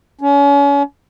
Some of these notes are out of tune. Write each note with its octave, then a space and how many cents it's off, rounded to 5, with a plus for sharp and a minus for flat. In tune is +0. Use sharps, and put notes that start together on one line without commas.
C#4 +35